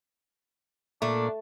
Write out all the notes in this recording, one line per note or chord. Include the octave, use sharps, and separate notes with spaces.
A#2 A3 D4